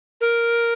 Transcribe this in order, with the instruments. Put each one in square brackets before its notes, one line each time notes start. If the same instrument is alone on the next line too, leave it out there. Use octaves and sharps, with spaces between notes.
[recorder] A#4